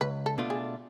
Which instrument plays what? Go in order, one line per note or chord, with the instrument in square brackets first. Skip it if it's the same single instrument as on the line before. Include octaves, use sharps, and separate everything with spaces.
[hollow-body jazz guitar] C#2 [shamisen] B4
[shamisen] A4
[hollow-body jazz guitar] B2 A3 D4 F4
[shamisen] G#4